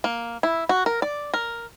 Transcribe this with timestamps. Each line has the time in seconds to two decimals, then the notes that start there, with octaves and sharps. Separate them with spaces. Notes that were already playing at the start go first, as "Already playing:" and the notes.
0.04 A#3
0.43 E4
0.69 F#4
0.86 A#4
1.02 D5
1.34 A#4